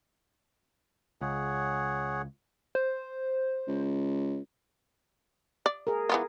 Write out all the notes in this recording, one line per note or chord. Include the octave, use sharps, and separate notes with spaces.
C#2 G#4 C#5 F#5
C5
C#2
D5
G#4 A#4
E3 B3 F4